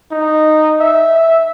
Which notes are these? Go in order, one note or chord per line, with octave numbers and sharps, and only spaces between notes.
D#4
E5